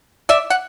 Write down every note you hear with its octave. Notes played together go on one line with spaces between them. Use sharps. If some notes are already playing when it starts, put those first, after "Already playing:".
D5 E5
F#5